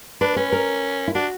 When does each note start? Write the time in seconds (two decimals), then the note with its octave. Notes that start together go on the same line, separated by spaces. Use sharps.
0.21 D4 B4
0.36 C#4 B4
0.52 A#4
1.08 E4
1.15 D4 F#4